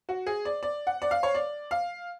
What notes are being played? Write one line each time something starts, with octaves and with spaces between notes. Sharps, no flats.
F#4
G#4
D5
D5
F#5
D5
F5
C#5
D5
F5